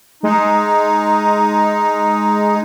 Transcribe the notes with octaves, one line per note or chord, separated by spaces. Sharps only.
G#3 D#4